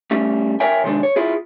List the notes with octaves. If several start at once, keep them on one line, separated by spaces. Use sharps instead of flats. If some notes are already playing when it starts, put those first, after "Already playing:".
G3 A3 C#4
A#4 C#5 E5 G5 G#5
C3 D#3 G#3 D4
C#5
E4 F4 G#4